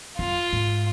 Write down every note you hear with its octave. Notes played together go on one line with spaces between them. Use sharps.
F#2 F4
G#2